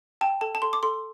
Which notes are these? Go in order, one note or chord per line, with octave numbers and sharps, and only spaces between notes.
G5 A5
A4 A5
A5
A4 C6
D6
A4 C6